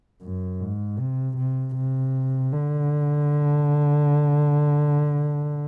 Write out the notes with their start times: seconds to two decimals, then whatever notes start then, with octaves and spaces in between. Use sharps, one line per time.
0.22 F#2
0.60 G#2
0.99 C3
1.37 C3
1.75 C3
2.52 D3